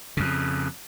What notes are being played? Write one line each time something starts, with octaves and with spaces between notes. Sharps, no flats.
F2 C#3